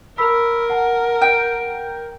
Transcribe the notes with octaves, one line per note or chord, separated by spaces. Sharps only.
A#4 B5 E6 B6
F#5 A5
G5